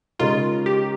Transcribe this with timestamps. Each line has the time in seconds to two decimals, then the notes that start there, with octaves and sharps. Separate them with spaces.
0.19 C#3 G#3 D#4 F4 A#4 C#5
0.66 G4